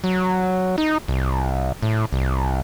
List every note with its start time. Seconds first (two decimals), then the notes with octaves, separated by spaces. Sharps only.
0.04 F#3
0.78 D#4
1.08 C2
1.82 A2
2.13 C2